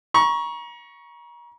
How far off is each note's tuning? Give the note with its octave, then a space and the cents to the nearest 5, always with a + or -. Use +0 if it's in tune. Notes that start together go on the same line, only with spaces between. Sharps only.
A#5 +35 C#6 +0